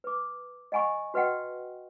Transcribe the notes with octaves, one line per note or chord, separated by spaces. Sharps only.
B4 D6
D#5 F#5 G#5 B5 C#6
F#4 B4 D#5 F#5 G5